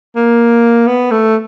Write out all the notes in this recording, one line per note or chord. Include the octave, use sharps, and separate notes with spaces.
A#3
B3
A3